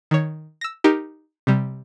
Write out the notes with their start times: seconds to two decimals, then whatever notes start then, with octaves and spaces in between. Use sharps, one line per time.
0.11 D#3 C#5
0.61 E6 A#6
0.84 D#4 G4 A#4
1.47 C3 G3